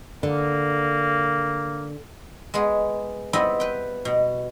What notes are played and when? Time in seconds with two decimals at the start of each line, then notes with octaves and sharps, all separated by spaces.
0.23 D3 A#3
2.54 G#3 B3 G#4
3.33 G3 B3 C4 E4 D#5
3.60 B4 G5
4.05 B2